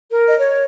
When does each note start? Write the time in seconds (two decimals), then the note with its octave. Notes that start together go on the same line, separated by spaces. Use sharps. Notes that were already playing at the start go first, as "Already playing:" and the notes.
0.10 A#4
0.29 D#5
0.38 C#5